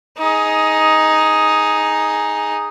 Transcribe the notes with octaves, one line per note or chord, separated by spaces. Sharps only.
D#4 G#4